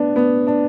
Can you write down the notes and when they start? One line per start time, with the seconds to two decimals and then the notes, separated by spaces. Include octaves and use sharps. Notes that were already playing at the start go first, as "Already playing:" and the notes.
Already playing: B3 D4
0.16 B3
0.47 D4